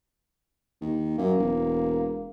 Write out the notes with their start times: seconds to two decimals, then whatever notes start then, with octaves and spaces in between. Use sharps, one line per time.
0.81 D#2
1.18 F#2 A#3
1.38 E1